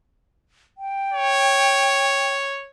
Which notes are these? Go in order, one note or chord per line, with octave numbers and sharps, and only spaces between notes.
G5
C#5